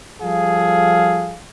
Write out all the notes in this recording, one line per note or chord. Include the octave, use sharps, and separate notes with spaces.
F3 G3 G#4 A4 F5